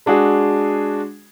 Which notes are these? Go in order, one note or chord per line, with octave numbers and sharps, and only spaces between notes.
G#3 D4 F#4 G#4